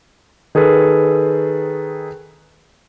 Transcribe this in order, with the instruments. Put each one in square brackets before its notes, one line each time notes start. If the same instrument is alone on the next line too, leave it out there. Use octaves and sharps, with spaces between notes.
[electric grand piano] D#3 G#4 A4 B4